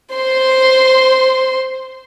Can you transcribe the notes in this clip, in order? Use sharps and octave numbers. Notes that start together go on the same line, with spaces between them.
C5 C6